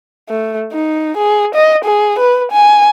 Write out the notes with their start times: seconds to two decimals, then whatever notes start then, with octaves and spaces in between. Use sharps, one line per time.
0.29 A3
0.73 D#4
1.17 G#4
1.55 D#5
1.85 G#4
2.19 B4
2.51 G#5